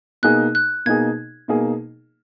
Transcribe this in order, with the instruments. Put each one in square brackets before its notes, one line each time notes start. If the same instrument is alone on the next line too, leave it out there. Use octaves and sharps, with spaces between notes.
[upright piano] B2 A#3 D#4 G#4 [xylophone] F#6
[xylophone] F#6
[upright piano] B2 A#3 D#4 G#4 [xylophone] G#6
[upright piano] B2 A#3 D#4 G#4